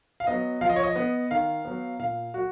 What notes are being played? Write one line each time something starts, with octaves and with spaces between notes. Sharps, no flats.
F5
F#3 B3 D#5
F3 F5
D#5
C#5
D#5
B3
D#3 F5
F#3 B3
A#2 F5
F#3 F#4